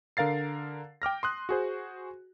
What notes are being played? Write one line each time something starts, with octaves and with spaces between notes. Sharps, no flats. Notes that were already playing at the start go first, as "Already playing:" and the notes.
D3 A#4 F5 A6 C7
G5 D6 F6 A#6
C6 D#6 F#6
F#4 G#4 C5